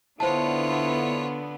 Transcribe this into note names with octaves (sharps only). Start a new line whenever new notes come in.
D3 B3 E4 F4 C5 C#5 A5